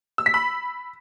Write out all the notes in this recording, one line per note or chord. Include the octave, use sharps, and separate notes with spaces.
E6
B6
B5